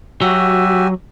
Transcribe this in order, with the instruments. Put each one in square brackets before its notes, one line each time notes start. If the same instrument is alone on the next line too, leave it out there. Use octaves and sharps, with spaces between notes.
[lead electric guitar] F#3 [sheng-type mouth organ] F#4 G4 G#5 [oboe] E5